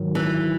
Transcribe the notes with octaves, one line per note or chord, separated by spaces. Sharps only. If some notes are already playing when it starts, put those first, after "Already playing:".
Already playing: G#2 D#3 F#3
E3